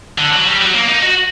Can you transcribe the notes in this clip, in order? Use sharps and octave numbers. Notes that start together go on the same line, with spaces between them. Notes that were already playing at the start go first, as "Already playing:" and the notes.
D3
F#3
G3
F#3
A#3
D#4
F#4